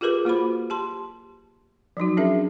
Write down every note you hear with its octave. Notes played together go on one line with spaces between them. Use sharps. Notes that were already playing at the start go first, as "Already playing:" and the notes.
F4 G4 G#4 A#4 B4 D6
A#3 F4 F#4 C5 B5
G4 A5 C6
F3 F#3 D#4 F#4
C#4 D4 G#4 A#4 E5